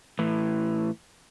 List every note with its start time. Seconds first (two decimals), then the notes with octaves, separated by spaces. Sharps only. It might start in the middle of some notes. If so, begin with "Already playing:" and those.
0.19 A2 E3